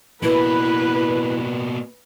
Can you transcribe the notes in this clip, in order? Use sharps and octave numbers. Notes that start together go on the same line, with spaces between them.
B2 A#3 E4 B4